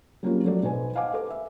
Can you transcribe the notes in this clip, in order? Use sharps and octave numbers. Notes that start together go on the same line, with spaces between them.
F#3 G3 A#3 C4 C#4 F4
F3 F#3 A3 F#4 D5
B1 B3 B4 C5 G#5
D#5 F5 F#5 G#5 D6
A4 B4 D6
E5